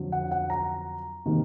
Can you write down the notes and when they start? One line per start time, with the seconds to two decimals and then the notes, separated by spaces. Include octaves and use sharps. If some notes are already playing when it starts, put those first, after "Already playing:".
Already playing: F2 D3 F#3
0.12 F#5
0.31 F#5
0.50 A#5
1.25 C3 D#3 G3 A#3 D#4